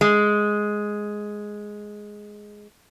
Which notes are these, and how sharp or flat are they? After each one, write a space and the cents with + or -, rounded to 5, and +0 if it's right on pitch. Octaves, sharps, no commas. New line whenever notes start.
G#3 +5